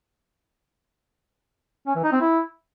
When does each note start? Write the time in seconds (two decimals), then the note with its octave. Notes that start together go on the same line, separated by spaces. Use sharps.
1.87 C#4
1.95 E3
2.04 D#4
2.13 C4
2.21 E4